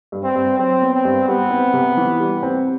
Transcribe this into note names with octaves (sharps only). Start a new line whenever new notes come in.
G2
C4
G2
F#3 C4
B3
C4
G2
G3 B3
C4
C3
E3
G3
C4